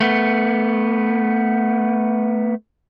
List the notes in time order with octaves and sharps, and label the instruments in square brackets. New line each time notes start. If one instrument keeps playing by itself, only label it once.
[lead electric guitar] A3 B3